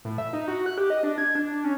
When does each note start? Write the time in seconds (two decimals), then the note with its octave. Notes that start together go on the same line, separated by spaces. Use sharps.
0.05 A2
0.18 E5
0.33 D#4
0.48 F#4
0.66 F#6
0.78 G4
0.90 D#5
1.03 D4
1.18 G#6
1.35 D4
1.49 D4
1.64 C#4